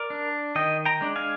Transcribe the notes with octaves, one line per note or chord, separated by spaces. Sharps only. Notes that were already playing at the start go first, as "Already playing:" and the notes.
Already playing: A#4 D5
D4
D#3 D#5 G5
G5 A#5
G#3 D4
F5 G#5